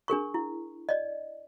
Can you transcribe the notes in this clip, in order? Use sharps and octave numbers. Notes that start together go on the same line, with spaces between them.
D4 G#4 A#4 C#6
E4
D5 D#5